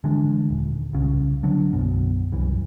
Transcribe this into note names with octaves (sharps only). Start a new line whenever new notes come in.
D3 E3 G#3 D4
D#1
C2 C#3
D3 F#3 D4
B1 F#2 B2
C2 F#2 E3